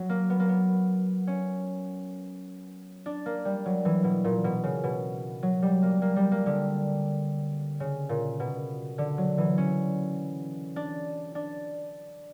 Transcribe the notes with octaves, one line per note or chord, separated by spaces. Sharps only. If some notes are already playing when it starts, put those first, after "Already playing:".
Already playing: F#3
A#3
B3
A#3
B3
C#4
D4
A#3
G3
F#3
E3
B2
A#2
B2
C#3
B2
F#3
G3
A#3
A#3
G3
A#3
D3
C#3
A#2
B2
D3
F#3
E3
C#4
D4
D4